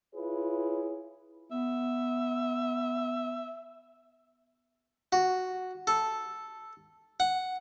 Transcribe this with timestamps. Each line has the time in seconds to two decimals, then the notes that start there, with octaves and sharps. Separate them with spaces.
0.15 E4 F4 G#4 B4 C#5
1.51 B3 E5
5.12 F#4
5.87 A4
7.20 F#5